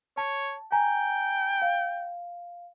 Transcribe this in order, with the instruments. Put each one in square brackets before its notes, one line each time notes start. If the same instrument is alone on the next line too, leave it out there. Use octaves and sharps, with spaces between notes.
[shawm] C#5 [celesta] A5
[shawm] G5 [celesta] G#5 A#5
[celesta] F5